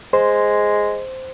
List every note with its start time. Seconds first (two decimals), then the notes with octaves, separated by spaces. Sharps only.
0.13 G#3 C5